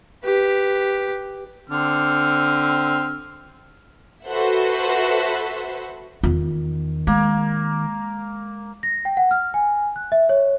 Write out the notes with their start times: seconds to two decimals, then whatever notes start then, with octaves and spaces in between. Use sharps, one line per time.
0.24 G4 B4
1.70 D3 C4 F6
4.26 F#4 A4 B4 C5 E5 F#5
6.23 E2 D#3 F4
7.07 G#3 A#3
8.83 A#6
9.05 G5
9.17 F#5
9.31 F6
9.54 G#5
9.96 F#6
10.12 E5
10.29 C#5